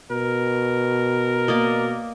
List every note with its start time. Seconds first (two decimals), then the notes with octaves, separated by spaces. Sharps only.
0.11 B2 A#4
1.48 A#3 D5 D#5